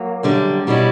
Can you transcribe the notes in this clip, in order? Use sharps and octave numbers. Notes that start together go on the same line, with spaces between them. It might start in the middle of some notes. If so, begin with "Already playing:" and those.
Already playing: F#3 A#3
F#2 D3 G3
B2 G3 C#4 E4